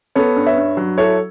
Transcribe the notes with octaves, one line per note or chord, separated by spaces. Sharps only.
B3 A4 C#5
G2
C#5 E5
G2
F#3
E4 A4 C#5